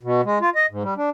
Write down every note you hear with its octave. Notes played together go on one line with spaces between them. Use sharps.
B2
G#3
F4
D#5
G#2
G3
D4